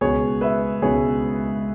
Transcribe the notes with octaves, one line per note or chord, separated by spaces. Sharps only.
C#2 B2 B3 G#4 C#5
B4 E5
C#2 B2 B3 G#4 C#5